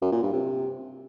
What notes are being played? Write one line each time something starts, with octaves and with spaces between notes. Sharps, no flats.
F#2
A#2
G2
C3